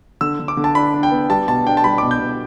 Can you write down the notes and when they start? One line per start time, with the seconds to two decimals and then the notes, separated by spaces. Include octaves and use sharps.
0.21 D3 E6
0.40 D3
0.48 D6
0.57 D3
0.64 A5
0.75 D4 B5
0.94 D4
1.03 G5
1.12 B3
1.30 G3 A5
1.48 B2 A5
1.66 D4 G5
1.77 A5
1.84 G3 B5
1.98 B2 D6
2.11 G6
2.20 B2